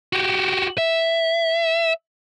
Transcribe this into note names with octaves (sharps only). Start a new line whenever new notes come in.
F#4 G4
E5